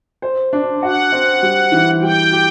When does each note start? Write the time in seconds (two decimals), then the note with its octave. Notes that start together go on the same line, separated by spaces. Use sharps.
0.22 C5
0.53 D4
0.83 F#4 F#5
1.12 C4
1.43 G3
1.72 E3
2.02 G3 G5
2.32 G4